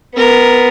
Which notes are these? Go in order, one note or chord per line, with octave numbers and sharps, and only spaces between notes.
B3 A#4